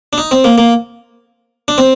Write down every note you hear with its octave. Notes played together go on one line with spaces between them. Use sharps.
D4
D#4
C4
A#3
A#3
D4
C4